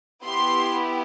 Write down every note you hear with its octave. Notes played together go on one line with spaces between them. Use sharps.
B3 E4 G4 C6